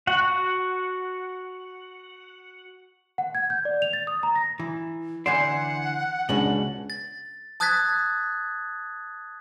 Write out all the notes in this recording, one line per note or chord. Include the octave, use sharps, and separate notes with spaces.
F#4 F#5
F#5
G#6
G6
D5
F7
A6
D#6
A#5
A#6
E3
D3 E3 D5 F#5 C6 G6 G#6 E7
C#2 B2 G#3 C#4 D4 F#7
A6
A5 D#6 F#6 G#6 A6 B6